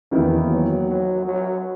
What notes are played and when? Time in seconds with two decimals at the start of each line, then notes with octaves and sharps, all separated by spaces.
0.11 E2 D#3 E3 A#3 E4
0.49 F#3
0.87 F#3
1.26 F#3